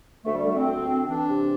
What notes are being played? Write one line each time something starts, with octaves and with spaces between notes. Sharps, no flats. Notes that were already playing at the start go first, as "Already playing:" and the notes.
D2 A3
G3
D3 A3
C4
D2
D3
E3 D4
C3